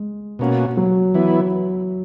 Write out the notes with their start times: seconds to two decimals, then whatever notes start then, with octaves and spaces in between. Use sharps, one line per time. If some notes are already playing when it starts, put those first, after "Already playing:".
Already playing: G#3
0.39 B2 A#3 C#4 F#4
0.77 F#3
1.14 E3 B3 E4